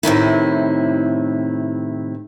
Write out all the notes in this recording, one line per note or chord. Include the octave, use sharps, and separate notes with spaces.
A2 C3 D#3 E4